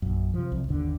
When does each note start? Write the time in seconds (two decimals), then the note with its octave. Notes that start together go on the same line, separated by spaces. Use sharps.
0.02 A#1 F#2
0.34 C3 F3
0.52 C2
0.69 G1 D#2 D3